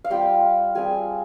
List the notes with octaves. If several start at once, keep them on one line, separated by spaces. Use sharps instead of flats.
F5
G3 C4 F4 G4 G5
G3 C4 F4 G#4 G#5